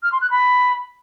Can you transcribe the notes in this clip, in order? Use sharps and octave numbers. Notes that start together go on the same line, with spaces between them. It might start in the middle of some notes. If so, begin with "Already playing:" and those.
F6
C6
F#6
B5